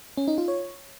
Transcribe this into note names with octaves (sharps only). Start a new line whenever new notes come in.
C#4
D#4
F4
C#5